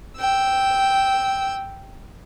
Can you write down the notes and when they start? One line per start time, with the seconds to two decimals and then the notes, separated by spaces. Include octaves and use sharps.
0.18 G5 E6